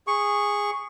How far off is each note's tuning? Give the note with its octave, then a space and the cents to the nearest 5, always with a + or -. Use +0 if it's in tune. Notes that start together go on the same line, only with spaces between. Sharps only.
G#4 -15 C#6 +0